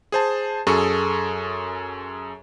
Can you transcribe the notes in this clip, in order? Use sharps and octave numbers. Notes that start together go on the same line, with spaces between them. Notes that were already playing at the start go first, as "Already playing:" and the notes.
G#4 C5 A5
F#2 G#4 A4 C#6